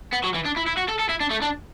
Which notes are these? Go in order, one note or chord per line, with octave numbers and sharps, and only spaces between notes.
B3
F#3
E3
D4
E4
E4
F#4
A4
A4
E4
D4
A3
D4